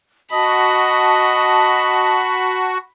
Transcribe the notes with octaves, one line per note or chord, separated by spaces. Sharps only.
F#4 D#5 A5 B5